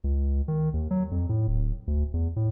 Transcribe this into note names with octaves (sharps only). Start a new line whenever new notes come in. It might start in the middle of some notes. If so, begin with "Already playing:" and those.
C#2
D#3
D#2
F#3
F2
A2
D1
D2
E2
A2